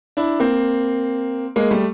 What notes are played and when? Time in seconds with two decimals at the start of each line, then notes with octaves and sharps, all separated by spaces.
0.17 D4 E4
0.40 A#3 C4
1.56 G#3 A#3
1.71 G3 A3